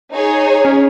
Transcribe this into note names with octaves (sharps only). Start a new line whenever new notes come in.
D#4 G#4 C#5
C#4